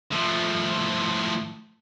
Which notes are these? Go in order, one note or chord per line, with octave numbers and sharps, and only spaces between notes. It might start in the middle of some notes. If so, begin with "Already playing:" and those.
A2 F3